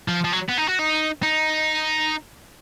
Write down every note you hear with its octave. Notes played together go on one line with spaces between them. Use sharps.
F3
F3
F#3
B3
D#4
F#4
D#4
D#4